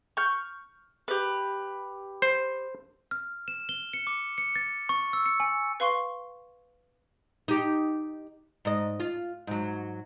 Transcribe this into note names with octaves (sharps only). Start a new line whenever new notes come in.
C#6 F6 G6
G4 B4
C5
F6
E7
G7
C#7
D6
C#7
A6
C#6
E6
C#7
G#5
B4 F5 C6 C#6 C7 G7
D#4 G4
G#2 D#5
F4
G#2 F#3